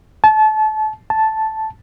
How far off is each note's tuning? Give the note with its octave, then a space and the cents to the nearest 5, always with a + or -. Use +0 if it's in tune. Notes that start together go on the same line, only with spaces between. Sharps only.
A5 -30
A5 -5